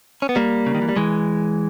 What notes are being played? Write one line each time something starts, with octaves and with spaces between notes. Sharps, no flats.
C#4
B3
G3 A#3
C#3
D#3
E3
G3
E3 G#3